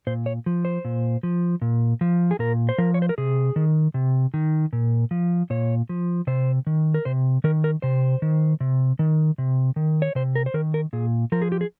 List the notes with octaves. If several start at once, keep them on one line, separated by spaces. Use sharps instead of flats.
A#2 C5
C#5
F3
C5
A#2
F3
A#2
F3
G#4
A#2 A#4
C5
F3 A#4
C#5
C5
A#4
C3 G#4
D#3
C3
D#3
A#2
F3
A#2 C#5
F3
C3 C5
D#3
A#4
C3 C5
D#3 A#4
A#4
C3 C5
D#3
C3
D#3
C3
D#3
C#5
C3 C5
A#4
C5
D#3 A#4
A#4
A#2 G#4
F3 A#4
G#4
G4
G#4